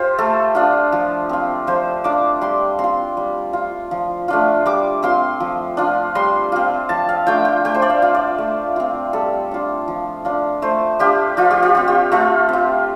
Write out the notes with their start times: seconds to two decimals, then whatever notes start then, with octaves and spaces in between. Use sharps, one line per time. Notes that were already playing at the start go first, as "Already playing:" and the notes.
Already playing: F4 G4 C5
0.18 A3 A4
0.55 D4 F4
0.92 F3
1.29 C4 F4
1.67 F3 C5
2.04 D4 F4 D6
2.41 G3 C6
2.79 C4 C6
2.84 F4
3.17 G3
3.53 F4
3.91 F3
4.28 A3 D4 F4
4.66 G3 D6
5.03 C4 F4 C6
5.40 F3
5.77 D4 F4
6.15 G3 C6
6.52 C4 F4
6.89 F3 A5
7.09 F5
7.27 A3 D4 F4 G5
7.45 G5
7.65 A3 G5
7.75 C5
7.82 D5
7.90 F5
8.02 F4
8.15 D5
8.38 A3
8.76 C4 F4
9.13 G3 A4
9.51 D4 F4
9.88 F3
10.25 D4 F4
10.62 A3 C5
10.99 D4 F4 G4
11.37 F3 F4
11.51 G4
11.63 F4
11.75 C4 F4
11.88 G4
12.12 A3 F4
12.49 C4 F4